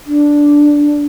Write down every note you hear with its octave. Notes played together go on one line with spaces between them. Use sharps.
D4